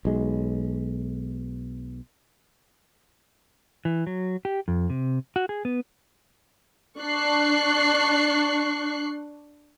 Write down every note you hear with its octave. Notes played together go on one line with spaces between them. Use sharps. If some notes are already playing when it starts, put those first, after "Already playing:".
B1 G#3
E3
F#3
G4
F2
C3
F#4
G#4
B3
D4 C#6 F#6 C7